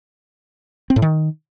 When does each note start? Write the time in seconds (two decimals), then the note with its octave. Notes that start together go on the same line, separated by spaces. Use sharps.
0.90 C4
0.96 A2
1.02 D#3